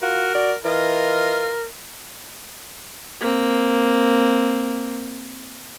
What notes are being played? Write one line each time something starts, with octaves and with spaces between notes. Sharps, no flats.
F4 F#4 A#4
F#4 D5
E3 F4 A#4 D#5
A#3 C4